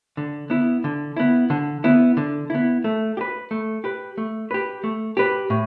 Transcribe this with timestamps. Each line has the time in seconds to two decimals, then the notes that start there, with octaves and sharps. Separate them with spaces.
0.17 D3
0.50 B3 E4
0.84 D3
1.17 B3 E4
1.50 D3
1.84 B3 E4
2.17 D3
2.50 B3 E4
2.84 A3
3.17 G4
3.21 B4
3.51 A3
3.84 G4 B4
4.18 A3
4.51 G4 B4
4.84 A3
5.17 G4 B4
5.50 A2